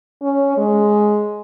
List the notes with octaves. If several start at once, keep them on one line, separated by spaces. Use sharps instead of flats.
C#4
G#3